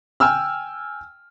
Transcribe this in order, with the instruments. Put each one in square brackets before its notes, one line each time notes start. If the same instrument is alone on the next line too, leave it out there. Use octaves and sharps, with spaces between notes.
[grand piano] G5 G#5 E6 F6